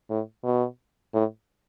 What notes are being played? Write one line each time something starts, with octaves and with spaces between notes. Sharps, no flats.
A2
B2
A2